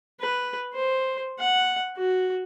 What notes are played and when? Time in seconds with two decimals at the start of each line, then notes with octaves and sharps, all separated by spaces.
0.20 B4
0.74 C5
1.39 F#5
1.97 F#4